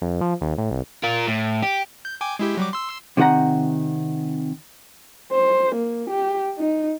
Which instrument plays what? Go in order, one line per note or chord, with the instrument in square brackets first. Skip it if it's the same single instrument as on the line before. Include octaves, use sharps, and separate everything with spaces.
[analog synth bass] F2
F3
D#2
A2
C2
[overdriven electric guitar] F4 A#4
A2
G4
[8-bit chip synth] G6
G5 G#5 D6
G#3 E4 G4
F#3 G3 D6
C6 E6
[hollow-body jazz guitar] C3 D#3 G#4 F#5 A#5
[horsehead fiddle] C5
A#3
G4
D#4